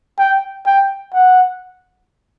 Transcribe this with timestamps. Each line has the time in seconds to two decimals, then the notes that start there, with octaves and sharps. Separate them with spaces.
0.18 G5
0.66 G5
1.13 F#5